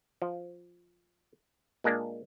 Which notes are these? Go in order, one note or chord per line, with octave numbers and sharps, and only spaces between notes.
F3
A#2 G#3 A#3 D4